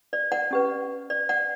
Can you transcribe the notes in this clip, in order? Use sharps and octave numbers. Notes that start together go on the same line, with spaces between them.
D5
D5 F#5
C#4 G4 B4
D5
D5 F#5